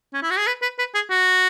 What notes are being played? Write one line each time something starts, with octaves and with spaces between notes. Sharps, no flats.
C#4
E4
F#4
G#4
B4
B4
B4
G#4
F#4